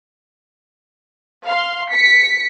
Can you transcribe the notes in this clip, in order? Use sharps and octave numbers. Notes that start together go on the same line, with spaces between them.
F5 C6
B6 C#7